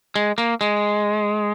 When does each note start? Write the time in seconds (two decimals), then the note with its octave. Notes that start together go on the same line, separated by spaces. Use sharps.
0.16 G#3
0.38 A#3
0.61 G#3